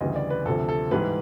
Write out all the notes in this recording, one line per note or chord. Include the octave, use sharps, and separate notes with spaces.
D2 C#3 E3 G3 D#5
D5
B4
D2 C3 F3 A4
A4
G#2 E3 G3 B4